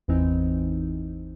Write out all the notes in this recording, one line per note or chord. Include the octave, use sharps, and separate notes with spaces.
G#1 E2 E3 C4 D#4